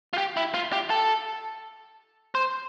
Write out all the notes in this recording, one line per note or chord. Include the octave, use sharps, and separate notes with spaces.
F4
G4
E4
F4
G4
A4
C5